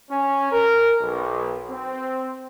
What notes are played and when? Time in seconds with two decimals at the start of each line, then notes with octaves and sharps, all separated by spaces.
0.11 C#4
0.52 A#4
1.02 B1
1.70 C4